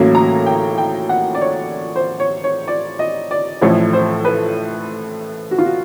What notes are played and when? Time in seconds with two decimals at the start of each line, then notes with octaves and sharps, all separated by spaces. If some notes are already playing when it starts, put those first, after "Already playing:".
Already playing: A1 A2 F#3 A#3 C#4
0.15 A#5
0.46 G5
0.78 G5
1.09 F#5
1.35 D5
1.41 C#5
1.96 C5
2.20 C#5
2.44 C#5
2.68 D5
2.99 D#5
3.31 D5
3.61 A1 A2 F3 A3 C#5
3.93 C5
4.25 B4
5.51 F#4
5.58 F4
5.66 F#4